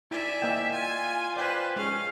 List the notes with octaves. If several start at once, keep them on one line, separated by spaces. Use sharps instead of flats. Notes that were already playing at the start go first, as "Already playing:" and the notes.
E4 D5 E5 G#5
A#3 D#5 G5
F4 G#5
B4 C5 D5 G5 G#5
G#3 C#4 G#4 F5